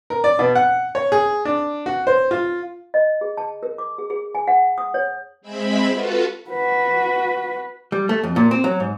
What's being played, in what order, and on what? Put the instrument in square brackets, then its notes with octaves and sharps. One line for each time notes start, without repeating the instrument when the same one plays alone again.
[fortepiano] A#4
D5
B2
F#5
C#5
G#4
D4
F#4
C5
F4
[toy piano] D#5
G#4
A5
A#4
D6
G#4
G#4
G#5
F#5
D#6
C#5
[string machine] G#3 C4 E5 B5
F4 F#4 A4 B4
[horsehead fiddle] F#4 B4
[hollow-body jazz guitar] G3
A3
F2
A#2
C4
F#3
G#2